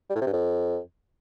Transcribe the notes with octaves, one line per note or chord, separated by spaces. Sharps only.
G3
A2
C3
G2
F2